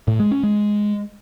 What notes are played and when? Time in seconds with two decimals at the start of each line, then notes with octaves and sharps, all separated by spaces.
0.08 A2
0.20 G#3
0.31 C#4
0.43 G#3